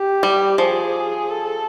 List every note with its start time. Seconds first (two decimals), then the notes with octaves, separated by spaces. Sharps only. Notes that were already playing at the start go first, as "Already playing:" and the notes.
Already playing: G4
0.23 G3
0.58 F3 G#4
1.29 A4